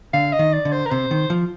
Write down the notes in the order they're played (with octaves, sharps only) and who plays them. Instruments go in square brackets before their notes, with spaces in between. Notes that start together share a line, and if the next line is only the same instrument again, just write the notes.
[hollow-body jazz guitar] D3 [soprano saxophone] F5
[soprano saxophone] D#5
[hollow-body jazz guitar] D#3
[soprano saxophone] D5
[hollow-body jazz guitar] D3
[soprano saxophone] C5
A#4
[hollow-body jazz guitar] C3 [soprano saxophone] C5
[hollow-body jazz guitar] D#3
F3